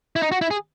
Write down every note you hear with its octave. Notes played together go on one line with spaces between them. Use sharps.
E4
D#4
F#4
E4
G#4